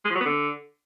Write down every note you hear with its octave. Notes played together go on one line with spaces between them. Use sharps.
G#3
F3
F#3
B3
D3